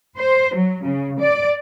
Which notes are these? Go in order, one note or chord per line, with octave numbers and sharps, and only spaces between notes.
C5
F#3
C#3
D5